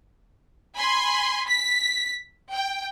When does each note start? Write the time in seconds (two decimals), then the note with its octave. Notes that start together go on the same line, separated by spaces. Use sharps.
0.78 G#5 B5 C6
1.48 B6
2.52 G5